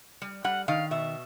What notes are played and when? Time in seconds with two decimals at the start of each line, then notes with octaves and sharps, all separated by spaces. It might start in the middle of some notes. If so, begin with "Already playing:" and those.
0.22 G3
0.44 G3 F#5
0.68 D#3 F5
0.91 B2 E5